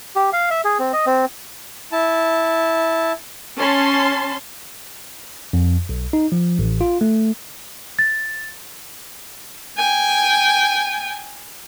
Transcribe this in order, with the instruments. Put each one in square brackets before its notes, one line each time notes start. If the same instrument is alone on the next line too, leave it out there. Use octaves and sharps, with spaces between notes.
[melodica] G4
F5
E5
G#4
C4
D#5
C4
[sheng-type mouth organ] E4 A5
[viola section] C#4 A5 C6
[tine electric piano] F2
B1
D#4
F3
A1
F4
A3
[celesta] A6
[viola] G5 G#5